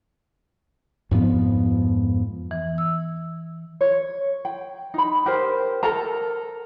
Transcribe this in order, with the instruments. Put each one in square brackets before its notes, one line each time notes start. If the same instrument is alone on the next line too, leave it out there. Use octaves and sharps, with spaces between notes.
[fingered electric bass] F2 G#2 F3 B3
[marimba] E3
E6
[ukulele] C#5
G5
D#4 B5
G4 A#4 C5
A4 A#4 A5 A#5